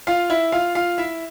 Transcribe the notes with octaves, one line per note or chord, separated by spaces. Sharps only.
F4 F5
E4 E5
F4 F5
F4 F5
E4 E5